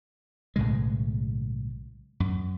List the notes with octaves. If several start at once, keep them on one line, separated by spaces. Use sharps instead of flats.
B1 A2 C#3 G#3
F#2